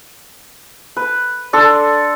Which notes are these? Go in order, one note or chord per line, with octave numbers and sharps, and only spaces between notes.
B4
D4 A4 C6